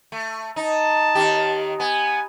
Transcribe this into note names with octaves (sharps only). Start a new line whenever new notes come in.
A3
D#4 A5
D#2 D#3 G4
B3 G#5